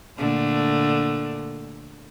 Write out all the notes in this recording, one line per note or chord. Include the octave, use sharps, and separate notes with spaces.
A#2 D3 A3